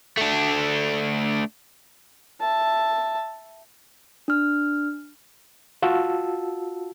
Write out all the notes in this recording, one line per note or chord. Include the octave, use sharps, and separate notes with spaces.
A3 D4
E5 A5
D4 F6
F4 F#4 A5 E6